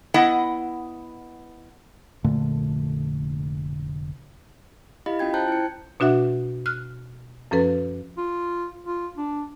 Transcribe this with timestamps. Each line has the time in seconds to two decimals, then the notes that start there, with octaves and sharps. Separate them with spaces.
0.14 B3 E4 D#5 F#5
2.24 F1 A#2 D3 A3
5.06 E4 G4 D#5 F5 B5
5.19 C#4 F4 G5 G#6
5.34 C5 G5 A5 A#5 F#6 G6
5.48 E4 C#7
6.00 B2 D4 F#4 E5 F#5
6.66 F6 F#6
7.51 F#2 F3 C#4 A4 B4
8.18 F4
8.85 F4
9.17 D4